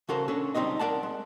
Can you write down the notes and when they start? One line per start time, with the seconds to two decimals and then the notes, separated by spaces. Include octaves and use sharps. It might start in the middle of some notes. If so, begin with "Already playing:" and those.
0.09 C#3 C#4 F#4 A4 A#4 C5
0.28 C#4 D4 A4 C#5
0.54 C#2 G3 C4 D#4 D#5
0.79 A#4 D5 F#5 A5
1.03 G#3